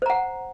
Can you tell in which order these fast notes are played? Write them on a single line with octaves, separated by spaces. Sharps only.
C5 A#5 F#5